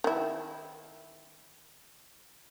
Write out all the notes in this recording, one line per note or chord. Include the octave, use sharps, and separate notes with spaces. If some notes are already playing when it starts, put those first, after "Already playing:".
D#3 E4